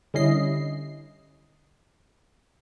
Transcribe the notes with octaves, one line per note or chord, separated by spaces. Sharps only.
D3 G3 C#4 E4 D#5 C7